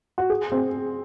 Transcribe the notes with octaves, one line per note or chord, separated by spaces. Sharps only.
F#4
G#4
C4